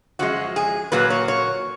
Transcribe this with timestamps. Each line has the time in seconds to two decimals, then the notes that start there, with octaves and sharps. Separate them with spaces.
0.19 F#2 F3 G#3 F#4
0.56 G#4
0.92 A#2 F#3 A#3 B4
1.10 C#5
1.28 C#5